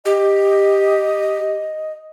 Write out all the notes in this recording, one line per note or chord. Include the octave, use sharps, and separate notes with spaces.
G4 D#5